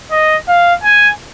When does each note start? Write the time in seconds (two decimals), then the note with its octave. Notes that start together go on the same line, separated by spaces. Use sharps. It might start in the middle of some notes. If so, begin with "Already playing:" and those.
0.11 D#5
0.48 F5
0.84 G#5